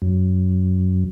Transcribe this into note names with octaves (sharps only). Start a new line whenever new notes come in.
F#2